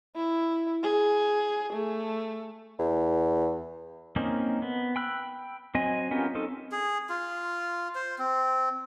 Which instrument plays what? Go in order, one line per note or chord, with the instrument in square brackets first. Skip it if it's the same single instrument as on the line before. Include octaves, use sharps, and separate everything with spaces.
[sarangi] E4
G#4
A3
[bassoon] E2
[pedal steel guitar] A#3 C4 C#4 D#4
B3
G5 B5 E6 F#6
F#3 C4 D#5 G#5
B3 C#4 F4 G4 A#4
C4 C#4 D#4 A4
[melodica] G#4
F4
C5
C4